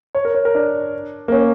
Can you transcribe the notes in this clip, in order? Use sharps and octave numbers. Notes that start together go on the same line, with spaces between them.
C#5
A#4
C#5
A#4
D4
A#3
C#4